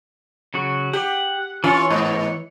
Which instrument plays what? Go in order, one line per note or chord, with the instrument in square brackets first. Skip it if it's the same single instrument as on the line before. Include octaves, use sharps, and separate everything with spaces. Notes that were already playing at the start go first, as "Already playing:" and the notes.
[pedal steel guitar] C#3 F#3 F#4
[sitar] G4 [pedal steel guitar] F#5
[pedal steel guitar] E3 C#5 [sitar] C#4 F4
[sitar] G#2 B3